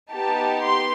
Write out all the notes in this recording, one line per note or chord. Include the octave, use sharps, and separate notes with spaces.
B3 D#4 G4 A5
C6